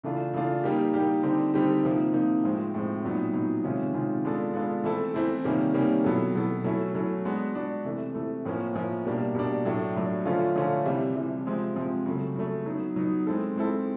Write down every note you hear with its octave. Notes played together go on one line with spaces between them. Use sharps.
C#3 E3 A3 D4 F4
C#3 E3 A3 D4 F4
G3 A#3 D#4 G4
G3 A#3 D#4 G4
D3 G3 C4 D#4 G4
D3 G3 C4 D#4 G4
C3 F3 A#3 D#4
C3 F3 A#3 D#4
A2 F3 G#3 C4
A2 F3 G#3 C4
A#2 F#3 B3 D#4
A#2 F#3 B3 D#4
C3 D#3 G#3 C#4 F4
C3 D#3 G#3 C#4 F4
G#3 B3 D4 F4 A4
G#3 B3 D4 F4 A4
E3 A3 C4 E4 A4
E3 A3 C4 E4 A4
C3 D#3 G3 A#3 C#4
C3 D#3 G3 A#3 C#4
B2 F#3 B3 E4 A4
B2 F#3 B3 E4 A4
F#3 A3 C#4 E4
F#3 A3 C#4 E4
G#3 B3 D4 F#4
G#3 B3 D4 F#4
C3 E3 A3
C3 E3 A3
A2 F3 A#3 C#4
A2 F3 A#3 C#4
B2 G3 A#3 D4
B2 G3 A#3 D4
A2 F#3 A3 D4
A2 F#3 A3 D4
D3 F3 A3 C#4 F4
D3 F3 A3 C#4 F4
C3 E3 G3
C3 E3 G3
C3 F3 G#3 C4
C3 F3 G#3 C4
C#3 F#3 A3
C#3 F#3 A3
F#3 B3 D#4
F#3 B3 D#4
G#3 C4 E4 A4
G#3 C4 E4 A4